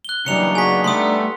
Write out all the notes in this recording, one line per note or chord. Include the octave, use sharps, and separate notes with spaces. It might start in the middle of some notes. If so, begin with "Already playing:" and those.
F#6 G7
C#3 E3 F#3 G3 D4 D#4 C#7 F7
B3 F#4 G#4 G#5 B6
G3 A3 B3 C6 D#6